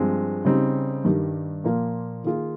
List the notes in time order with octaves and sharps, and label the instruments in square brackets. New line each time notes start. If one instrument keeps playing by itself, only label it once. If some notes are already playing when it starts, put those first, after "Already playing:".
Already playing: [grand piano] G2 F3 G#3 C4
C#3 G3 C4 D#4
G2 D#3 G3
A#2 F3 A#3 F4
D#3 A#3 F4 G#4